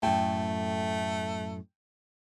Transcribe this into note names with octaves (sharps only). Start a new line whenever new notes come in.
F#2 A2 A3 G5